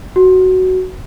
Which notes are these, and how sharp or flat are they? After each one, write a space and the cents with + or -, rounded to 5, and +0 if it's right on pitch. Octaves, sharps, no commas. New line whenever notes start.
F#4 +5